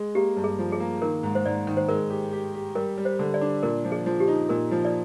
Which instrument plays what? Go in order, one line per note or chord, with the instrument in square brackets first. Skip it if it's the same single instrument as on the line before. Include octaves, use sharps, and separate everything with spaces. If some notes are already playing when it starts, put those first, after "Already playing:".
Already playing: [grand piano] G#3
[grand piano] A#3 [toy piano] G4
[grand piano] G2
[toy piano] G#4
[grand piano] F3
[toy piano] G#4
[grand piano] A#3
[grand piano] D#3 [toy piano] A#4
[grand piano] G#2
[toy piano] C5
[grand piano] G#2 [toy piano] D5
[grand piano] D#3
[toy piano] C5
[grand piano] G#3 [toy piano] A#4
[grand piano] G4
G4
G4
[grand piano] G3 [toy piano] A#4
[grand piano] G3
[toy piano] C5
[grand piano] D3
[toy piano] D5
[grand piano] D4
[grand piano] A#2 [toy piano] A#4
[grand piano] F3
[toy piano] G#4
[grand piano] F3
[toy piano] G4
[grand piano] D#4
[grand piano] A#2 [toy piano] A#4
[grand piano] F3
[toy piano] D5